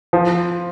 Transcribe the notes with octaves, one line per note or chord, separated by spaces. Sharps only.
F3